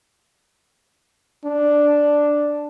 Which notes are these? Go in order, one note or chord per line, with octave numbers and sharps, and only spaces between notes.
D4